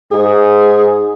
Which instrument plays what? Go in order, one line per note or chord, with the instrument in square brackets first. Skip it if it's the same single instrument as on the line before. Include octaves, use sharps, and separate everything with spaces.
[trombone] G#2 [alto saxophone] G#4